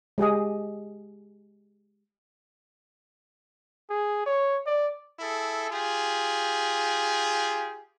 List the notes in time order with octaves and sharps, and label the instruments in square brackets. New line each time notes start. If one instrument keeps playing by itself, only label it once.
[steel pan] G#3 G4 G#4 D#5
[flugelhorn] G#4
C#5
D5
[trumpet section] E4 G#4 A4
F4 G4 G#4